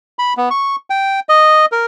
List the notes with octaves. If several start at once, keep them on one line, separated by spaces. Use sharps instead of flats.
B5
B3
C#6
G5
D#5
A#4